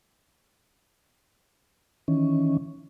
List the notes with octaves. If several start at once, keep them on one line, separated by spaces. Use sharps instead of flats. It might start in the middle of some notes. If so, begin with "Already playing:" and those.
D#3 E3 C#4